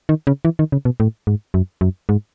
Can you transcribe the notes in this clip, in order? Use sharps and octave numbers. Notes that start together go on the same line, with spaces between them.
D#3
C#3
E3
D#3
C#3
B2
A2
G#2
F#2
F#2
G#2